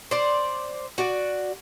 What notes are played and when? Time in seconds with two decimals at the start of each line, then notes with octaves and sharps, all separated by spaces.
0.11 C5 D5
0.98 F#4 D5